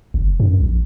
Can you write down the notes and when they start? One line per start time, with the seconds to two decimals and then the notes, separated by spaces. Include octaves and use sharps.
0.14 F#1
0.40 F#2
0.60 A#1